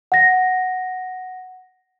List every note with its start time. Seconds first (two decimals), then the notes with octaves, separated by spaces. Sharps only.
0.12 F#5 A#6